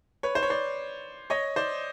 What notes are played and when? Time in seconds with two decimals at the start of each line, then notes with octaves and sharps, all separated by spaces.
0.23 B4 C#5
0.35 C5
0.43 C#5
0.50 C5 D5
1.30 C#5 D#5
1.56 C5 D5